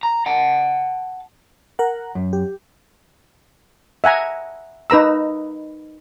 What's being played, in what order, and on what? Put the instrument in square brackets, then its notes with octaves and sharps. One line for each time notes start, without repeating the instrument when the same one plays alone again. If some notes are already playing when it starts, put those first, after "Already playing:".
[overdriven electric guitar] A#5
F#5 A5
[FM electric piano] A#4 F#5
[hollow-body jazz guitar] F#2
[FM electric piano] G4
[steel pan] E5 F#5 G#5 A#5
D#4 B4 A#5 E6